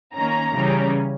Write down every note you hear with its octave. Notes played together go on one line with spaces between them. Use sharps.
D#3 A#3 C#4 A#5
C#3 E3 G3 C#4